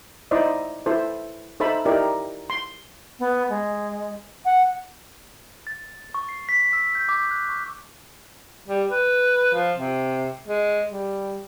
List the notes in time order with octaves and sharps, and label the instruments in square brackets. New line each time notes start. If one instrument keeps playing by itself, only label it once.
[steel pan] D#4 E4 C5 D5 D#5
E4 A4 C5
D#4 A4 C5 E5 A5 B5
D#4 E4 G4 A#4 D5
C6
[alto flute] B3
G#3
F#5
[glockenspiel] A6
C#6
C7
B6
E6
G6
D6
F#6
C#6
[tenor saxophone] G3
B4
F3
C3
G#3
G3